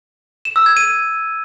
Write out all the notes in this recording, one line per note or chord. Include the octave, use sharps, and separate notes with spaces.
E7
E6
G#6
D#7